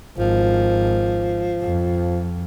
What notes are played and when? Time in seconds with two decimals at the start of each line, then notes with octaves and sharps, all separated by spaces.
0.18 G#1 F3
1.62 F2